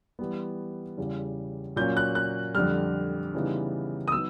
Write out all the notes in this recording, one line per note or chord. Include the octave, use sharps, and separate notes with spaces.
E3 G3 B3
E2 C#3 E3 G3
A#2 F#3 A#3 C#4 G6
F#6
F#6
F2 D3 G3 F6
C#3 E3 G3 B3 D#4
D#6
F#3 B3 D#4 E6